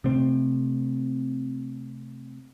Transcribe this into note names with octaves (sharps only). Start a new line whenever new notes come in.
C3 A3 C4